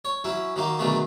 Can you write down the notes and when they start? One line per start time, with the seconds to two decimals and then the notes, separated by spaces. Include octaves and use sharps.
0.05 C#5
0.24 F#3 C#4 E4
0.56 D#3 F#3 A#3 D#4
0.79 B2 D3 D#3 F#3 A3 G#4